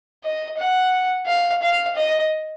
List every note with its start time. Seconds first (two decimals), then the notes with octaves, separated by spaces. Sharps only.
0.24 D#5
0.58 F#5
1.27 F5
1.62 F5
1.96 D#5